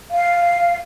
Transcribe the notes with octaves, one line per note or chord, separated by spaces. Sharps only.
F5